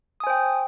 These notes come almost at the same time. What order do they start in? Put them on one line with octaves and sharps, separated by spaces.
D#6 G#5 C5 G5